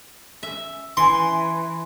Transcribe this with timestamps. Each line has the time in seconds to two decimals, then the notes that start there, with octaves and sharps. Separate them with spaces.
0.43 E5
0.97 E3 C6